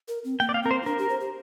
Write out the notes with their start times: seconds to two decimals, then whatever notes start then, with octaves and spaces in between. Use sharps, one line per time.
0.08 A#4
0.24 C4
0.40 A#3 G5
0.49 D5
0.54 F5
0.63 C4 A#4
0.71 C5
0.82 F4
0.85 D4 A#4
0.98 G4
1.09 C5
1.20 G4